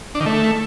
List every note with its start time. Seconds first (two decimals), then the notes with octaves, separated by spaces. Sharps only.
0.15 D4
0.20 D#3
0.26 A3